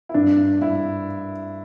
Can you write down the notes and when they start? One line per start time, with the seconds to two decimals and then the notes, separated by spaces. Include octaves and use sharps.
0.09 E4
0.14 G2 D4
0.61 G2 E4